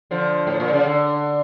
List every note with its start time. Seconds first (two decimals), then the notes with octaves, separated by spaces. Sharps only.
0.11 D3 F3
0.47 A2
0.60 A#2
0.73 C#3
0.86 D3